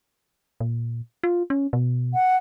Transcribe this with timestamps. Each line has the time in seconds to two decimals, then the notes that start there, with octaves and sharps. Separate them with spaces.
0.60 A#2
1.24 F4
1.50 C#4
1.73 B2
2.14 F#5